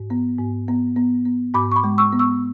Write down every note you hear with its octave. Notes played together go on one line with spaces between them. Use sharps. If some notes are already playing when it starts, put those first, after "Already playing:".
Already playing: G#2
B3
G#2
B3
B3
B3
G#2 B5 D6
C#6
B5 D6
G#3
C#6 E6
B3
C#6 E6